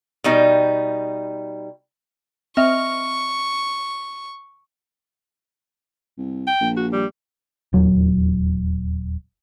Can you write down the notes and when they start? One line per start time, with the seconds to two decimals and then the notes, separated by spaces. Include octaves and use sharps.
0.24 B2 G3 D#4
2.57 C4 D#5 E5 C#6 F6
6.18 C2
6.47 G5
6.61 A#1
6.77 F#4
6.92 G3
7.73 D#1 E2 F#3